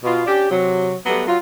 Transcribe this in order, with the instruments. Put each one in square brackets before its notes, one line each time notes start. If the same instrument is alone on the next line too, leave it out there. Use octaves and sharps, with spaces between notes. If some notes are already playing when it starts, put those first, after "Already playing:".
[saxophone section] B2 F4
C#4 D4 G4
C3 F#3
F#3 G3 A3 B3
F#3 F4